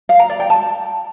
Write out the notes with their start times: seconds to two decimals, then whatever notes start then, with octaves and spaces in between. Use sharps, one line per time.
0.09 F5
0.19 A#5
0.30 D5
0.40 G5
0.50 A5